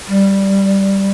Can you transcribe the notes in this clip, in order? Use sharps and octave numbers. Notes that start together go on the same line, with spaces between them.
G3